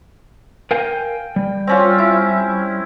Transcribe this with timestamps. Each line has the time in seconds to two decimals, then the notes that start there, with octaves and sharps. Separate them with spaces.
0.71 A#4 F5 G5 G#5
1.36 G3
1.67 C4 C#4 F4
1.98 E4